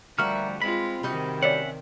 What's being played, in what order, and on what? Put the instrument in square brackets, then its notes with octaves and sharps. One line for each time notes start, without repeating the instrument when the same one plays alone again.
[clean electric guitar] D2 F3 F#4 [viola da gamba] G3 [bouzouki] A#3 E5 F#5 [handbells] F6
[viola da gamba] G#3 F4 [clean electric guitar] C4 B5 [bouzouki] B4
[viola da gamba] C3 D#3 [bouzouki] G3 D#4 F#4
[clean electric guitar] C#4 E5 F#5 [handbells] C#5 D5